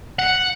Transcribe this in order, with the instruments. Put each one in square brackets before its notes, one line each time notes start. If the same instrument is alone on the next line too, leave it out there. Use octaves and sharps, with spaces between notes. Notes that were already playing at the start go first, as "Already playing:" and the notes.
[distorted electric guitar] F#5